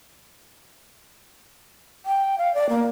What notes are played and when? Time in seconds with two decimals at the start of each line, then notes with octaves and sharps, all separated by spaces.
2.06 G5
2.38 F5
2.54 D5
2.69 A#3